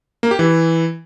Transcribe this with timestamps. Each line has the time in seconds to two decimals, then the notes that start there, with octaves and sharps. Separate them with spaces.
0.23 A#3
0.31 G4
0.39 E3